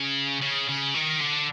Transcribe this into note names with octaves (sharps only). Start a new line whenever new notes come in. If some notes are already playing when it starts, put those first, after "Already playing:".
Already playing: C#3
C#3
C#3
D#3
D3